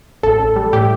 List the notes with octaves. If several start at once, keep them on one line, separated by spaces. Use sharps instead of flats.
A1 A4
A1
G3
A2 G4